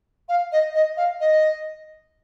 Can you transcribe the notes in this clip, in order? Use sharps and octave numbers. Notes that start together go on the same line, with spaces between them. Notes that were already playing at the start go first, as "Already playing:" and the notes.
F5
D#5
D#5
F5
D#5